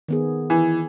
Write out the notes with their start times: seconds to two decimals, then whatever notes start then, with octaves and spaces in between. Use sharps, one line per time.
0.08 D#3 B3 G#4
0.50 E3